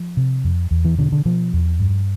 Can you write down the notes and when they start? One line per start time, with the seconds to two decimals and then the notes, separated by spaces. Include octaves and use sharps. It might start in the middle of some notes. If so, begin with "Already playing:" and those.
Already playing: F3
0.17 C3
0.44 F2
0.71 E2
0.85 E3
0.99 B2 D3
1.12 D3
1.25 B2 F3
1.53 E2
1.80 G2